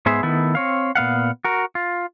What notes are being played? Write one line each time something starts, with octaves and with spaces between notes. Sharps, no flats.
G#2 B3 G#4 C5 E5
D#3 A3 B3 E4
C4 C#5 F5
A#2 B3 F5 F#5
F#4 A#4
F4